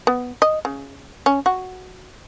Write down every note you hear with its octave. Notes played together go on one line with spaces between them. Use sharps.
B3
D#5
C#3
C#4
F#4